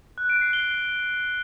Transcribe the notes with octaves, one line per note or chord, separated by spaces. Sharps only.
F#6
D7
C7
G7